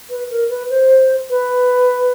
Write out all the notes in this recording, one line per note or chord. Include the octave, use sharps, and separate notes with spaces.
B4
A#4
B4
C5
B4